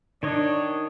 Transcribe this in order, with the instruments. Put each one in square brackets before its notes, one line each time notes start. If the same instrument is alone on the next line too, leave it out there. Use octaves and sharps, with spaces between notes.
[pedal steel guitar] D#3 C#5 D#5 [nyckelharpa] D4